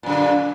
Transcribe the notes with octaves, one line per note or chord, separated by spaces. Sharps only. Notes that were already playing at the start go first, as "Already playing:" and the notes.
F#2 A#2 D3